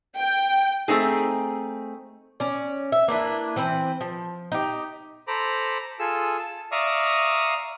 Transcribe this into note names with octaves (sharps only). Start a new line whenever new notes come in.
G5
A3 C4 D#4 G#4
C#4 D5
E5
A#3 D4 E4 B4
E3 C4 B4 C5
F3
D#4 G4
A4 C5 A#5 B5 D6
F4 G#4 A4 E6
A5
D5 E5 F5 A#5 C#6 D#6